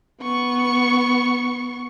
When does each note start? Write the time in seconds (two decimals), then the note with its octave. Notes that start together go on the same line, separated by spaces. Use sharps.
0.22 B3 C#6